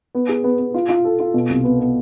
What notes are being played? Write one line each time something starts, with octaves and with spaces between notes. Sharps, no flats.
B3
G#4
B3
B3
F4
F4
A4
F4
B2
C2
B3
B3